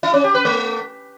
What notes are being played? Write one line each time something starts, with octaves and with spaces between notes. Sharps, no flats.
E4
C#4
G4
B4
A3